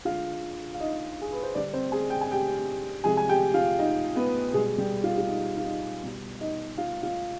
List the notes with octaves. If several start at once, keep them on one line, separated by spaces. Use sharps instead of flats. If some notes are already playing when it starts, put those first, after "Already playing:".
D3 G#3 F4 F5
F5
D#4 D#5
G#4
B4
C5
D3 G3 D4 D5
C4 C5
G#4 G#5
G5
G#5
G4 G5
C3 F3 G#3 G#4 G#5
G#5
G4 G5
F4 F5
D#4 D#5
B3 B4
B2 G3 G#3 G#4
G3 G4
F4
F4
D#4
F4
D#4
B2 G3
D#4 D#5
F4 F5
F4 F5